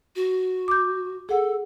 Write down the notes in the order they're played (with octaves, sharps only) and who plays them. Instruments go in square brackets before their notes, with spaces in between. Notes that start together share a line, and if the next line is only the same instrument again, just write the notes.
[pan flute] F#4
[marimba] D6 G6
[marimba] G#4 F#5 [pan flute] A4